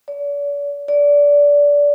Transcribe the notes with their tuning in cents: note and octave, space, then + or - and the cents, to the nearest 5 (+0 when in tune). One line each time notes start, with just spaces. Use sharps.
D5 -45
D5 -20